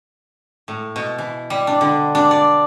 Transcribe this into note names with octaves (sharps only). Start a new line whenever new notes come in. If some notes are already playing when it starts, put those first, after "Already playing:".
A2
B2
E3
G3
D4
D3
D4
D5